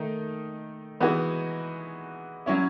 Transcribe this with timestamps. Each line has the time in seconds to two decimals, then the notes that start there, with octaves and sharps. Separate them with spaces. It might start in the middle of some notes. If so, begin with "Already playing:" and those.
Already playing: D#3 A3 D#4
1.00 E3 G#3 B3 D#4 F#4
2.46 F#3 C#4 E4